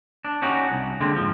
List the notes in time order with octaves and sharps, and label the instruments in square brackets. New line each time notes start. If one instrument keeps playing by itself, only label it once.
[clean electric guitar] D4
C#4 D#4 F#4 G4
C2
D3 G#3 A#3 C4
G#2 F3